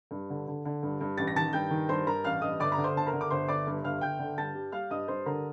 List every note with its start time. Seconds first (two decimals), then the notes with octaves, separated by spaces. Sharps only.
0.11 G2
0.30 D3
0.47 D3
0.65 D3
0.83 G2
1.01 G2
1.18 A1 A6
1.27 A#6
1.36 D#3 A5 A6
1.53 G2 G5 G6
1.71 D#3
1.89 G2 C5 C6
2.06 G2 A#4 A#5
2.24 A1 F5 F6
2.42 G2 D#5 D#6
2.60 G1 D5 D6
2.72 A#5
2.78 D3
2.84 C5 C6
2.95 G1 A5
3.07 A#4 A#5
3.13 D3
3.21 D6
3.30 G1 C5 C6
3.48 G1 D5 D6
3.67 G2
3.84 G1 F5 F6
4.01 G1 G5 G6
4.19 D3
4.38 G2 A5 A6
4.55 G3
4.72 G3 F5 F6
4.90 G2 D#5 D#6
5.08 G2 C5 C6
5.26 D3 A#4 A#5